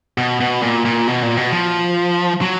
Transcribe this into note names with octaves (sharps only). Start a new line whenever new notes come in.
B2
B2
A#2
A#2
B2
A#2
B2
F3
F#3